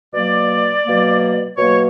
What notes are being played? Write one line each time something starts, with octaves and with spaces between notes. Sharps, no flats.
B2 F#3 A#3 D5
B2 F#3 A#3
B2 F#3 A#3 C#5